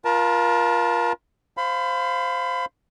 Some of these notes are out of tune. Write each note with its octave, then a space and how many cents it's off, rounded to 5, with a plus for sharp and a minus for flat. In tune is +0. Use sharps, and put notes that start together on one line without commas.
F4 +0 A#4 +35 A5 +0
C5 +0 F5 +0 B5 +30